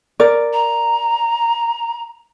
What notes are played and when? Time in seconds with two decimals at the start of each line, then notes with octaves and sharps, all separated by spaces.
0.20 A#4 D5
0.53 A#5